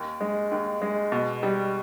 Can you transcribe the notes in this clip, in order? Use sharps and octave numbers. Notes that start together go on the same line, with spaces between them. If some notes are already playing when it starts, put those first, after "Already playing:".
Already playing: D#2
G#3
D#2
G#3
B2
G3